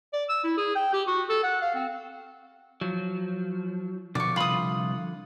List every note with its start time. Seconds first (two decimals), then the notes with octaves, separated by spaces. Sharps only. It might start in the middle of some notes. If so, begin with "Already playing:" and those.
0.13 D5
0.29 E6
0.44 E4
0.58 G#4
0.75 G5
0.93 G4
1.07 F#4
1.29 A4
1.44 F#5
1.62 F5
1.75 C4
2.81 F3 F#3
4.15 B2 D3 F3 D5 C#6
4.36 C2 F4 B5 D#6